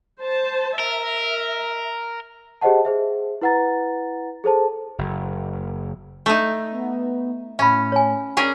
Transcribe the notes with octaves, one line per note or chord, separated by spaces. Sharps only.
C5 A5
A#4 E5
G4 G#4 C5 D#5 F#5 A5
G#4 C5 E5
E4 B4 F#5 A#5 A6
G#4 A4 C5 A5
F#1
A3 D#4
B3
A2 C#4 E5 B5
C#5 G#5
C#4 G#4 A#4 D5